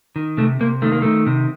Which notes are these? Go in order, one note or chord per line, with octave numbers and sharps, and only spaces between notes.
D#3
C3 A3
C3 A#3
D#3 A3
A#3
D#3 A3
C3